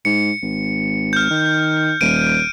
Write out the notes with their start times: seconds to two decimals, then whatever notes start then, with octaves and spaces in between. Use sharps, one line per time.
0.05 G#2 C#7
0.42 G#1
1.13 F6 G6
1.30 D#3
2.01 D#1 D7 D#7